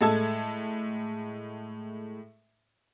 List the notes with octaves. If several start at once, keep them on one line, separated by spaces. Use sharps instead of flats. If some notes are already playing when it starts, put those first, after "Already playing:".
A2 G#3 A4 A5 E6 G#6